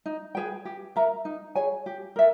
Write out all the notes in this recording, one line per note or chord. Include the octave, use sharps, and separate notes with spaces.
D#4
G#4 B4 G5
G4
A#4 E5 A#5
D#4
G#4 C#5 G#5
G4
A#4 E5